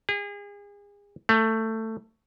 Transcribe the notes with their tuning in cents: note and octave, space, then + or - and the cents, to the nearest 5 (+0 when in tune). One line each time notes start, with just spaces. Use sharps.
G#4 -35
A3 +15